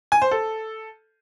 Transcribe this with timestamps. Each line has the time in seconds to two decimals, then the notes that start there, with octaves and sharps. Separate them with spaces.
0.12 G#5
0.22 C5
0.31 A4